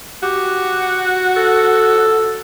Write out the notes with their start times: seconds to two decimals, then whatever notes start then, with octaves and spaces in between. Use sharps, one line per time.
0.23 F#4 G4
1.36 A4